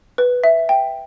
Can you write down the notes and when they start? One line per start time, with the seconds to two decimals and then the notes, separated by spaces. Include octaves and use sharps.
0.18 B4
0.44 E5
0.69 G5